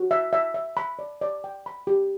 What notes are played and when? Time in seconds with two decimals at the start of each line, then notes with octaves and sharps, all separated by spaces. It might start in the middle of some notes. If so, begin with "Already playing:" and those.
Already playing: F#4
0.11 E5
0.33 E5
0.54 E5
0.77 B5
0.99 D5
1.21 D5
1.44 G5
1.66 B5
1.87 G4